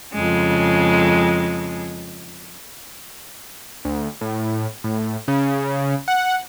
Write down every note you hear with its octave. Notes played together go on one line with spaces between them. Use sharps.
F2 C#3 G#3
D2
A2
A2
C#3
F#5